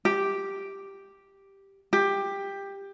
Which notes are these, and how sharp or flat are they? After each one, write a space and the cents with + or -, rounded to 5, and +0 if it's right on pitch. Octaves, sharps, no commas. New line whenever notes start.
G4 +0
G4 +15